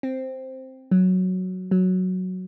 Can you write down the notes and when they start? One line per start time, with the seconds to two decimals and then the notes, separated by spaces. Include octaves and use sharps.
0.03 C4
0.91 F#3
1.71 F#3